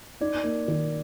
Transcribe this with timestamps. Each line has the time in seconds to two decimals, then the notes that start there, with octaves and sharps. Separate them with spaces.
0.21 D#4 D5
0.44 A#3
0.68 D#3